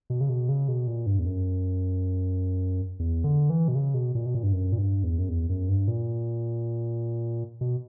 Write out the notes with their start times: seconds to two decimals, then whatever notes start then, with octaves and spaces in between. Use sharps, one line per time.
0.10 B2
0.21 C#3
0.29 B2
0.49 C#3
0.68 B2
0.87 A#2
1.06 G2
1.19 E2
1.25 F#2
2.99 E2
3.24 D3
3.50 E3
3.68 B2
3.75 C#3
3.94 B2
4.15 A#2
4.26 B2
4.34 A#2
4.43 G2
4.53 F#2
4.72 A#2
4.78 G2
5.04 E2
5.19 F#2
5.29 E2
5.49 F#2
5.68 G2
5.88 A#2
7.61 B2